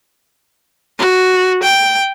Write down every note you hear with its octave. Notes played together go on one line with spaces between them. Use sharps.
F#4
G5